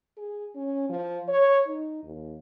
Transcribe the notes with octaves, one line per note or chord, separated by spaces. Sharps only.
G#4
C#4
F3
C#5
D#4
D#2